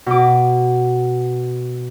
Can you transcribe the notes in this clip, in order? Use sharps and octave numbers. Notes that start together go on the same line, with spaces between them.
B2 D6